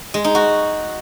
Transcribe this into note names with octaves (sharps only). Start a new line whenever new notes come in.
G#3
D#4
F#4